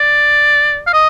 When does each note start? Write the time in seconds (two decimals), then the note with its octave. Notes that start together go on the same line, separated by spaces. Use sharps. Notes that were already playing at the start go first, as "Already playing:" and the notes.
Already playing: D5
0.87 F5
0.93 D#5